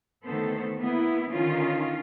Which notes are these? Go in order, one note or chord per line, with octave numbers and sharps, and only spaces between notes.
D2 D#3 B3 A4 C5
A#3 B3 E4
D3 D#3 C#4 F4